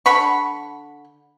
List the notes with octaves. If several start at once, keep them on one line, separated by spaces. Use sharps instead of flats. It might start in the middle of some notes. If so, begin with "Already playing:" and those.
D3 F#5 B5 C#6